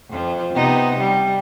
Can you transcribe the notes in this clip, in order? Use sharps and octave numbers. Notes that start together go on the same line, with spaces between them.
F2 F3
C3 B3 D#4
G3